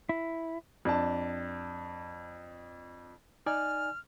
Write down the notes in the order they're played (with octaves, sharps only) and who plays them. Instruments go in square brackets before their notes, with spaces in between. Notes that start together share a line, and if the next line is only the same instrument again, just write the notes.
[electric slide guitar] E4
[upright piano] F2 D4 A5
[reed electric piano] D#4 D5 G#5 [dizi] F6